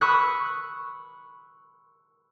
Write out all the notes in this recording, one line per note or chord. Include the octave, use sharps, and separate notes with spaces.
B5 C#6 D#6 E6 F#6 B6